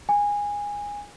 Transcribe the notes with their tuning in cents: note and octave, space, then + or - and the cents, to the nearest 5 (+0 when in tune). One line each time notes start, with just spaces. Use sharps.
G#5 -20